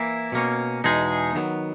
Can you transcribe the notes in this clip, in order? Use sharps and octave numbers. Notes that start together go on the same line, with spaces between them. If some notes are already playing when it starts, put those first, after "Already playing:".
Already playing: E3 A#3 E4
B2 A#3 C#4
E2 B2 G#3 D#4 G#4
D#3 F#3 B3